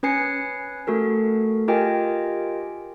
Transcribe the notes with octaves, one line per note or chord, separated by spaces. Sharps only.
C#4 B4 G#5 C7 C#7
A3 F#4 A4 A#4
F4 G4 A#4 D#5 G5 G#5